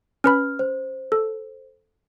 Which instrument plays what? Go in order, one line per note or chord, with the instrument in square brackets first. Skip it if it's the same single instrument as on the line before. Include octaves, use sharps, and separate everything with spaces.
[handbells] C#4 B4 B5 [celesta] F6
[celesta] C5
[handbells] A4